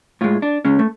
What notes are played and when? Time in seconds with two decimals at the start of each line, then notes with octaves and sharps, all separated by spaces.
0.21 A2 G#3 F4
0.42 D4
0.65 C#2 C#3 G#3 C#4
0.79 A3